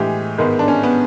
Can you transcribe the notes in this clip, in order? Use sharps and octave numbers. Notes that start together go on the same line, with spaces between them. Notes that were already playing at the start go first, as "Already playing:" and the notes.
Already playing: A2 E3 G#3 G4 G#4
G#2 D#3 G#3 B3
D4
C#4
B3